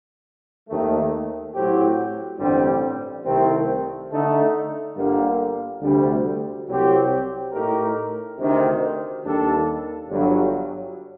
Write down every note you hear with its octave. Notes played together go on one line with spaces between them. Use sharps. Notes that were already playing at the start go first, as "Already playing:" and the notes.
D#2 D#3 A3
A2 F#3 C4 G4
A1 G2 D3 G3 C4
C2 C3 D#3 A3 C4
D3 A3 D#4
G1 G2 D3 G3 A#3
D2 C3 G3
C2 C3 F#3 C4 G4
A2 A3 D#4 G4 A#4
D2 C3 D#3
D#2 D#3 G3 D4 A4
G1 G2 F#3